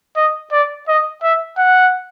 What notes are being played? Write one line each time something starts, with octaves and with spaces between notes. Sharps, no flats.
D#5
D5
D#5
E5
F#5